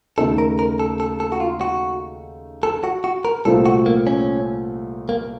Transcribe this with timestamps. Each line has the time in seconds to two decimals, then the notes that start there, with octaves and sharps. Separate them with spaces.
0.18 D#2 C#3 A3 D#4 A4
0.38 A#4
0.59 A#4
0.80 A4
1.00 A4
1.20 A4
1.32 F#4
1.40 F4
1.61 F#4
2.63 A4
2.84 F#4
3.04 F#4
3.25 A#4
3.45 C2 A#2 A3 C4 F4 A4
3.66 F#4
3.86 A#3
4.07 C#4
5.09 A#3